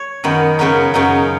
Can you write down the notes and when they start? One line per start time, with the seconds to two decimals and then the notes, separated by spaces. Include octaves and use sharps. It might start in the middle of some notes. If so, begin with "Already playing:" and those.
Already playing: C#5
0.24 F#2 D#3 B3
0.59 F#2 C#3 B3 D#4 B4
0.94 F#2 C#3 B3 D#4